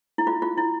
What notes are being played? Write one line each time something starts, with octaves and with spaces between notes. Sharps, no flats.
E4
F4
F4
E4